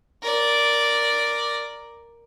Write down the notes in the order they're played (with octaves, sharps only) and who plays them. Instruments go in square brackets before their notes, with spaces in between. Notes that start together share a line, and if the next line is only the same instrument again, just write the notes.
[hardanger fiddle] A#4 D5